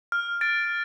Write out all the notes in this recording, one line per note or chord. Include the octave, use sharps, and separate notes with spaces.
F6
A6 D7